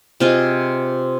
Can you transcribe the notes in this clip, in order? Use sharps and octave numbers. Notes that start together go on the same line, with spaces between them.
C3 F4 G#4 D#5